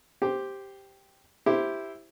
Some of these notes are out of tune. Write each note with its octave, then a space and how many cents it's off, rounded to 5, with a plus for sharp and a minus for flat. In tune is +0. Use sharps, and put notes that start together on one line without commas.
G4 +0 C5 +0 G5 +0
E4 +0 G4 +0 C5 +0